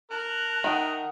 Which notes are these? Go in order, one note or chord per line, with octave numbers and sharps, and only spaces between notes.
A#4 A5 F#6
D#3 E5 F#5 D#6